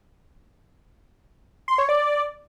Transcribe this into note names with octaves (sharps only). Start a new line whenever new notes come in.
C6
C#5
D5